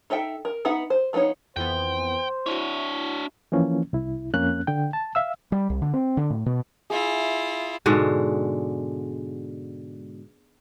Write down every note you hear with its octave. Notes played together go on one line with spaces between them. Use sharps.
D#4 A4 E5 G5
A#4
B3 D#4 E5 F#5
C5
F3 A3 B3 D#4 C#5
F2 E3 B3 C5 G5
D4 E4 F#4 C#5
E3 F3 A#3 C#4
C2 E4
F2 A#3 C#4 F#6
D3 G5
A5
E5 F5 E6
G3
C2
D3
C4
D3
A2
B2
E4 F4 G#4 E5
G#2 B2 D3 G#3